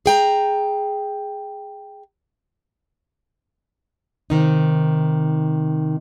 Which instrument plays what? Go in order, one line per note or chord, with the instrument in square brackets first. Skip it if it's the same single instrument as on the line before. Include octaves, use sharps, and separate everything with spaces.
[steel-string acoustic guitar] G#4 G5 A#5
[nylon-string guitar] C3 D#3 D#4